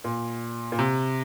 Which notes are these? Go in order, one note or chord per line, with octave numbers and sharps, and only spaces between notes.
A#2
A#2
C3